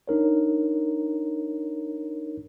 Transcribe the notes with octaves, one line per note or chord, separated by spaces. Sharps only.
D4 D#4 A#4 C#5